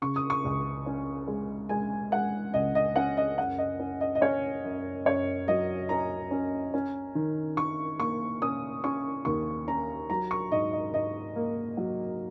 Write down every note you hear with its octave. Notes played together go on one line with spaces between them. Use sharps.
C#3 C#6
D#6
C#6
C#2
C#4
G#3
G#3 G#5
G#3 F#5
C#2 D#5
D#5
C#4 F#5
D#5
F#2 F#5
D#5
C#4
D#5
D#5
C#4 C#5
F#2
F#2 C#5
F#3 D#5
C#4 A#5
C#4
C#4
D#3
D#3 C#6
A#3 C#6
C#4 D#6
C#4 C#6
D#2 C#6
C#4 A#5
F#3 A#5
C#6
G#2 D#5
D#5
G#2 D#5
A#3
F#3